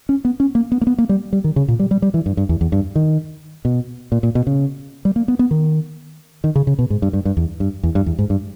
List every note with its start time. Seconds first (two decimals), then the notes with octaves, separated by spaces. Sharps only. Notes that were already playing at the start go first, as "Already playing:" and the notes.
0.09 C#4
0.25 B3
0.40 C#4
0.55 A#3
0.72 B3
0.81 A#3
0.87 B3
0.98 A#3
1.09 G3
1.33 G3
1.44 D#3
1.56 C#3
1.68 A#2
1.79 G3
1.91 G3
2.02 G3
2.14 E3
2.26 G2
2.37 G2
2.49 E2
2.61 E2
2.72 G2
2.96 D#3
3.65 B2
4.12 A#2
4.23 A#2
4.35 B2
4.47 C#3
5.05 G3
5.16 A#3
5.28 B3
5.39 B3
5.51 D#3
6.44 D#3
6.55 C#3
6.67 C#3
6.79 B2
6.90 G#2
7.02 G2
7.13 G2
7.25 G2
7.37 E2
7.60 G2
7.83 E2
7.95 G2
8.06 E2
8.19 G#2
8.30 G2